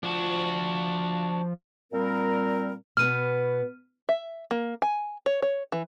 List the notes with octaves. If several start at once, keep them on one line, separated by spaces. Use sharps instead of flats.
F3 D4 F#4
A#2 G3 C4 A#4
B2 B3 F6 D#7
E5
A#3
G#5
C#5
C#5
E3